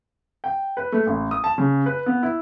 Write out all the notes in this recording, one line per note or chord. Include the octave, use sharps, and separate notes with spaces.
G5
B4
A3
A1
D#6
A5
C#3
B4
B3
E4